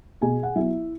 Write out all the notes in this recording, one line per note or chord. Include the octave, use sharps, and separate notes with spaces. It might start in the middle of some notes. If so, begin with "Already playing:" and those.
B2 G#4 G#5
F#5
F#3 B3 E4 E5